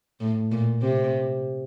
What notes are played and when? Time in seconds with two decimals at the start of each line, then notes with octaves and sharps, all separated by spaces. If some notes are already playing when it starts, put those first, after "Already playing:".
0.20 A2
0.52 A#2
0.82 C3